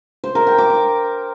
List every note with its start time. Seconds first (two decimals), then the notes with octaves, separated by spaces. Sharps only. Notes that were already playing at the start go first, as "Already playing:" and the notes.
0.24 C5
0.35 A#4
0.47 G5
0.58 D6
0.70 D6